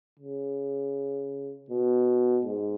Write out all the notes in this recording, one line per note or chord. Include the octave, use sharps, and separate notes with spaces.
C#3
B2
G#2